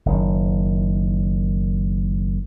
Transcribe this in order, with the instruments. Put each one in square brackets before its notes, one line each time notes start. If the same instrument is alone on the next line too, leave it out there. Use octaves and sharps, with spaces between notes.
[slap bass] F#1 D#3